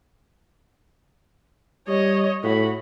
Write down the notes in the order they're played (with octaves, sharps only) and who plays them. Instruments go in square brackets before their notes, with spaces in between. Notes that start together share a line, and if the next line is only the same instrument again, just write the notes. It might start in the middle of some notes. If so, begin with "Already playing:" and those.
[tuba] G3 [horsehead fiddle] C#5 D#5
[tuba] A2 [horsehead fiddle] F#4 B5